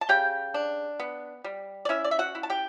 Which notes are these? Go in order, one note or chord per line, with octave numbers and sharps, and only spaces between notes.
A5
C#3 G4 G5
D4
B3
G3
D5
C#4 E4 E5
D5
E5
F#4 F#5
E4
A5
G4 G5